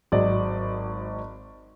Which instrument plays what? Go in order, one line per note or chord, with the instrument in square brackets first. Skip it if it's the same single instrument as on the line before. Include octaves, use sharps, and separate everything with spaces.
[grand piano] G#1 F#3 D5 D#5